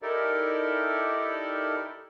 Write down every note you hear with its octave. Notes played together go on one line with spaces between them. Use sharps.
D#4 E4 G4 A4 A#4 D5